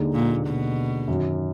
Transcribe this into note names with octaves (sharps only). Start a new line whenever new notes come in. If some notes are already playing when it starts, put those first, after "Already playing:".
Already playing: D#2 D3 G#3 D#4 G#4
A#2
B2
F#2 D#3 F#3